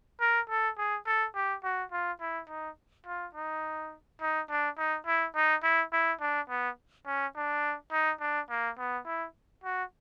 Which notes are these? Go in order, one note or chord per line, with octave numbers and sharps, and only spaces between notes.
A#4
A4
G#4
A4
G4
F#4
F4
E4
D#4
F4
D#4
D#4
D4
D#4
E4
D#4
E4
E4
D4
B3
C#4
D4
D#4
D4
A#3
B3
E4
F#4